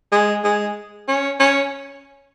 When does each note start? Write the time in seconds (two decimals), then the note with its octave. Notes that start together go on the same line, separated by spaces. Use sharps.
0.12 G#3
0.44 G#3
1.08 C#4
1.40 C#4